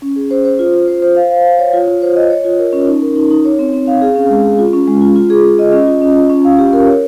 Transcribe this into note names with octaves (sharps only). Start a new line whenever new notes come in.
C#4
G#4
C5
C5
F4
C5
C5
C5
F5
F5
F5
C#5
F4
F4
C5
D#5
C#5
F4
A#4
C#4
D#4
A#4
D#4
D#4
C#5
C4
C4
F5
G#4
C#4
G#3
G#4
F4
C#4
G#3
F4
F4
G#4
G#4
D#5
C#4
F4
C#4
F4
C#4
F5
G4
A#4
C#5